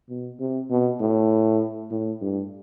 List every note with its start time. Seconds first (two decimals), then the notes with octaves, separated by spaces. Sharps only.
0.09 B2
0.40 C3
0.70 B2
1.00 A2
1.91 A2
2.22 G2